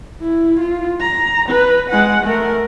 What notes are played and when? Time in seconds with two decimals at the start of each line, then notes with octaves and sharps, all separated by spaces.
0.21 E4
0.60 F4
1.00 A#5
1.49 B4
1.90 G#3 F#5
2.24 A3 A#4